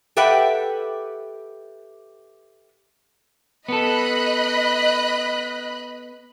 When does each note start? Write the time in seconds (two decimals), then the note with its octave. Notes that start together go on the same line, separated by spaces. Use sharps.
0.17 G4 A4 B4 E5 F#5 G5
3.68 B3 A4 D#5 B5 F#6